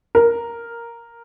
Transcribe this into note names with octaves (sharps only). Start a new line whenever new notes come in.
A#4